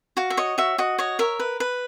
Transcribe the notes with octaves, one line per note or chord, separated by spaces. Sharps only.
F#4 F5
E5
C#5 D#5
F#4 E5
F#4 D#5
C#5 D#5
A#4 E5
B4
B4